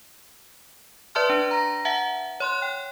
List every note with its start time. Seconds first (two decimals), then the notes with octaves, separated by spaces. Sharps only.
1.15 B4 D5 E5 A5 C6 F6
1.30 D4
1.51 A#5 A#6
1.85 E5 F#5 A5
2.40 C#5 C6 F#6
2.62 G5